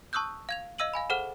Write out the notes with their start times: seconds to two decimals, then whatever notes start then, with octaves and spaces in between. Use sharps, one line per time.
0.13 A5 C#6 D#6 E6 F#6 G6
0.49 F5 G#6 F7
0.78 D#5 F5 E6 D#7 F#7
0.94 F5 G#5 B5
1.10 G#4 A4 C5 F#5 F6 E7